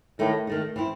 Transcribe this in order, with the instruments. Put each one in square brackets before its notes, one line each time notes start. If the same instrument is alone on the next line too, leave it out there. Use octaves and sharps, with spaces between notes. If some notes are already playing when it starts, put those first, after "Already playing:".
[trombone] A2 [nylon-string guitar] D#3 A3 D#4
[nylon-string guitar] D#3 A3 D#4
E3 C4 E4